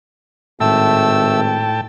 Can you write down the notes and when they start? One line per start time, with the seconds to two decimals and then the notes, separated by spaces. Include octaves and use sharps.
0.60 G#1 A2 A3 G5 A5 E6